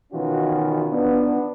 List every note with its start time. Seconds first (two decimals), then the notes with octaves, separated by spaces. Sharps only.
0.13 B2 D#3 E3 C#4 F4 F#4
0.92 B3 D4